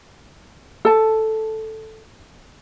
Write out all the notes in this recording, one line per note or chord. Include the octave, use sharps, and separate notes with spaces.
A4 A5